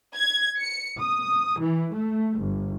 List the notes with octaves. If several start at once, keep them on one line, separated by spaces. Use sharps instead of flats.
G#6
C#7
D#6
E3
A3
G1